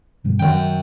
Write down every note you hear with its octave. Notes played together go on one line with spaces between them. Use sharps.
G2 B2 G3
F#2 D#3 C#4 G5